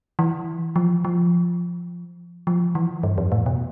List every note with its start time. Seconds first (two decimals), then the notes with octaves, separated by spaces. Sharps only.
0.19 E3
0.76 F3
1.05 F3
2.47 F3
2.75 E3
3.03 G2
3.18 F2
3.32 A2
3.46 B2